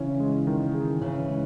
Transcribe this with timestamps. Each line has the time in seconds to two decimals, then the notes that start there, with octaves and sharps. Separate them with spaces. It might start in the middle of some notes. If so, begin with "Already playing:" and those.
Already playing: C#3 E3 C#4
0.20 G#3
0.47 D#3
0.74 G#4
1.01 C#3 E3 C#4
1.29 G#3